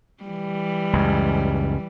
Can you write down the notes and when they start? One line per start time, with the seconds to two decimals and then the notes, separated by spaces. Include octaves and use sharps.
0.23 E3 G3
0.93 C#2 F#2